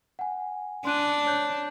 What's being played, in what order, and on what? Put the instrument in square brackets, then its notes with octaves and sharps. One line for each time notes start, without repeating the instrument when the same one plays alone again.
[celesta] F#5 G#5
[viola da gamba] D4 [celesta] C6 F#6 D#7
[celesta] C#5 F#6 G6